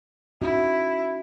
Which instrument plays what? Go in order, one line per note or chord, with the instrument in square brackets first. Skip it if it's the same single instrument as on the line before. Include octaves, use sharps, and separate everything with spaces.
[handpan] C#4 D#4 F#4 [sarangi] E4